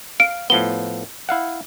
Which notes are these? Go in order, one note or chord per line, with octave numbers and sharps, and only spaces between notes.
F5 D7
A2 F3 B3 G7
E4 F5 F#5